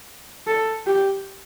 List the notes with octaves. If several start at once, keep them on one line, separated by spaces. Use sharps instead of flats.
A4
G4